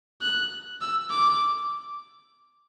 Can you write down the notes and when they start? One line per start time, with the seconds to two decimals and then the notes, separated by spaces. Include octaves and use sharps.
0.22 F#6
0.81 E6
1.11 D6